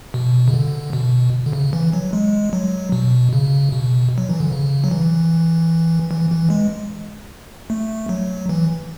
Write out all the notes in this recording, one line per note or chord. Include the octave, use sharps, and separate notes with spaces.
B2
C#3
D3
B2
D3
C#3
E3
F#3
G#3
F#3
B2
C#3
B2
F#3
E3
D3
C#3
F#3
E3
E3
E3
G#3
A3
F#3
E3